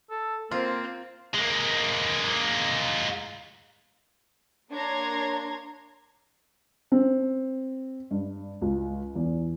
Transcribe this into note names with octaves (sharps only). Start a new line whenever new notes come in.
A4
A#3 C4 F4
G#3 A#3
A#3 D4 C#5 A#5 C6 G#6
C4
G2
C#2
E2